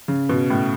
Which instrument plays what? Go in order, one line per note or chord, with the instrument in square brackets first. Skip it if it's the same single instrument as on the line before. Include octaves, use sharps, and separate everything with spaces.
[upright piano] C#3
B2
A2